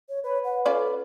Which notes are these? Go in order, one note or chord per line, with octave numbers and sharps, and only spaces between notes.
C#5
B4 C#5
F#5
C#4 F4 A4 D5